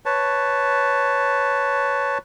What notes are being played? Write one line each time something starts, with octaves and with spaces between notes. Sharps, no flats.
B4 C#5 A5